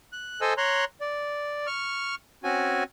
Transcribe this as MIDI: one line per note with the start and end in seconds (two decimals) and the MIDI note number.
0.13 0.41 90
0.41 0.54 69
0.41 0.54 72
0.41 0.54 75
0.41 0.54 80
0.41 0.54 88
0.58 0.85 73
0.58 0.85 82
0.58 0.85 84
0.58 0.85 90
1.01 1.67 74
1.67 2.15 85
1.67 2.15 89
2.44 2.84 60
2.44 2.84 61
2.44 2.84 66
2.44 2.84 80